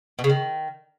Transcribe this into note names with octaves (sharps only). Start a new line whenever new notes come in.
B2
C#3
D#3